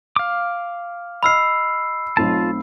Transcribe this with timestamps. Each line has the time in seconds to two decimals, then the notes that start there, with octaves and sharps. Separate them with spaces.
0.16 F5 D6
1.23 D#5 B5 E6 F6 C7
2.17 B1 A3 C4 F4 A5